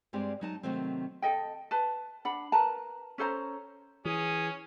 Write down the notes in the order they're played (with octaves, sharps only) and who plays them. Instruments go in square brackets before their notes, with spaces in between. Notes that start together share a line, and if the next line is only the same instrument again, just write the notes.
[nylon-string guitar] G2 G3 G#3 C4 G4 D5
F#3 D#4 A5
C3 D#3 F#3 A3 C4
[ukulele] A4 D#5 G5
B4 A5
D4 F#5 B5
A#4 B4 A5 A#5
C#4 A4 C5 A#5
[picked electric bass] E3 [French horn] C#4 [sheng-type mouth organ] G#4 D#6